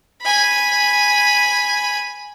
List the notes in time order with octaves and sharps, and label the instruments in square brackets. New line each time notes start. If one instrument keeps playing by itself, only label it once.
[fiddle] G#5 B5